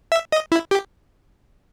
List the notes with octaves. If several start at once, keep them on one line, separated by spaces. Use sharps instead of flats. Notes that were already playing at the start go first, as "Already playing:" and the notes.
E5
D#5
E4
G4